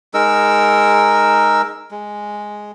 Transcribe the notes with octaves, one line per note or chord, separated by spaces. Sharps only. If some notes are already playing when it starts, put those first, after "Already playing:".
G#3 D#4 A#4 E6
G#3